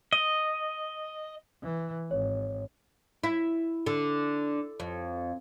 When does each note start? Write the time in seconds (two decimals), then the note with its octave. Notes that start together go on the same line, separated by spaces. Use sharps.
0.13 D#5
1.63 E3
2.11 G#1 C#5
3.23 E4
3.86 D3
4.80 F2